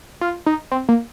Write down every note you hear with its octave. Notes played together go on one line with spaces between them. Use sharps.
F4
D#4
C4
A#3